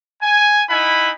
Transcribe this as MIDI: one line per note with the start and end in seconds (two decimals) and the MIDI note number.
0.22 0.62 80
0.69 1.10 63
0.69 1.10 64
0.69 1.10 78
0.69 1.10 80
0.69 1.10 83